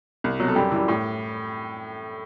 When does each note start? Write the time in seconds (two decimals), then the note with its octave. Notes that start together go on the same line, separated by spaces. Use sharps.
0.24 C2
0.40 B2 F#3
0.48 A4
0.56 F#2 G3 G4
0.72 E3 G3
0.88 A2